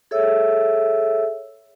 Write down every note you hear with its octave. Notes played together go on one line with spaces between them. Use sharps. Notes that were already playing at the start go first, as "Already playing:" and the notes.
G#4 A4 C#5 E5 E6